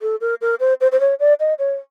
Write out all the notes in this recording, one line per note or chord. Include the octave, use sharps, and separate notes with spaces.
A4
A#4
A#4
C5
C5
C5
C#5
D5
D#5
C#5